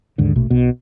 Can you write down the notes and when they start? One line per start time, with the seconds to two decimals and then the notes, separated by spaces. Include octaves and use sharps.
0.18 D#2 G#2 D3
0.36 A#1 B2 A3
0.50 B1 B2